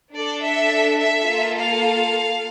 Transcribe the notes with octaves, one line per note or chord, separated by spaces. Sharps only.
D4 A4 D5
E5
E5
A#3 F4 A4
F5